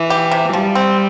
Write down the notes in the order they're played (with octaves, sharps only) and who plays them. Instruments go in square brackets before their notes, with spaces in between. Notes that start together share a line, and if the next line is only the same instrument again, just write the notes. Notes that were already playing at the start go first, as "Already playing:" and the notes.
Already playing: [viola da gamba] E3
[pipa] G4
C3
[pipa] F3 [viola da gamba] G3
[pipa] C4